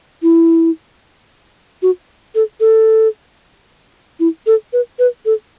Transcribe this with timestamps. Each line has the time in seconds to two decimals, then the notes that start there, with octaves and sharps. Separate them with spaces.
0.23 E4
1.82 F#4
2.35 A4
2.60 A4
4.20 E4
4.47 A4
4.73 B4
4.99 B4
5.26 A4